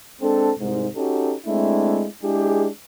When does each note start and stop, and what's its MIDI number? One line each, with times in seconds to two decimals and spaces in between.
0.22 0.52 56
0.22 0.52 60
0.22 0.52 62
0.22 0.52 69
0.59 0.88 36
0.59 0.88 44
0.95 1.34 61
0.95 1.34 63
0.95 1.34 66
0.95 1.34 67
0.95 1.34 69
1.46 2.07 56
1.46 2.07 57
1.46 2.07 60
1.46 2.07 62
1.46 2.07 64
2.23 2.68 56
2.23 2.68 62
2.23 2.68 64
2.23 2.68 67
2.23 2.68 68